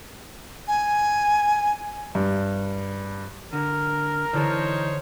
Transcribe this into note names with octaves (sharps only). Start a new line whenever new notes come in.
G#5
G2
D3 A#4
D3 E3 D#4 A4 C5 C#5